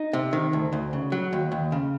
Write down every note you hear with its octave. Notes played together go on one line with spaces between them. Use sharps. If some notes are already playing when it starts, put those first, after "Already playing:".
Already playing: D#4
C3
D#3
D2
D2
C#3
F#3
D#2
D#2
C#3